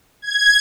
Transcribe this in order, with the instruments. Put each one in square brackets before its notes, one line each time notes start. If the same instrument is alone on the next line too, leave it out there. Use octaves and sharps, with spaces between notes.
[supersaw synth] G#6